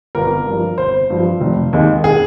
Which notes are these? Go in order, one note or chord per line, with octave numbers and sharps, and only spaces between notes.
G1 A#4
G2 F3
G1 C5
G2 F3
F1
D#2 D#3 G#3
G#4